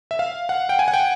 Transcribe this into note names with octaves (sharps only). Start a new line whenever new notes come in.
E5
F5
F#5
G5
G#5
F#5
G5